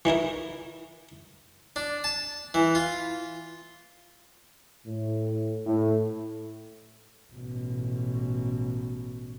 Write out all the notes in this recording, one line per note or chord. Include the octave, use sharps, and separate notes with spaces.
E3 D#4 E4 A#4
D4
A5
E3
F4
A2
A2
A1 B2